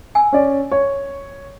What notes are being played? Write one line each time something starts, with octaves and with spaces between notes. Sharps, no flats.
G#5 E6
C#4 D5
C#5